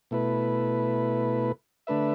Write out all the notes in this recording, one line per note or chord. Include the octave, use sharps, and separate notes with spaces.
B2 A3 E4 B4
D3 A3 D4 B4 E5